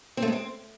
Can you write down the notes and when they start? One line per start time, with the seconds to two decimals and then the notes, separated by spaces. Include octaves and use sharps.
0.17 C4
0.22 A3
0.27 G#3
0.33 C4